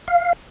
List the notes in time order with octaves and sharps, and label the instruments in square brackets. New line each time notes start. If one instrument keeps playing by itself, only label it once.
[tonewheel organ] F5